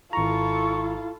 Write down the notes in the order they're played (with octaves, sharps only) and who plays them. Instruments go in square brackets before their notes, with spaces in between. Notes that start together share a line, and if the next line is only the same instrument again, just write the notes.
[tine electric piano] G#1 A#5 [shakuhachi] E4 [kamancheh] F4 A4 [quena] C#6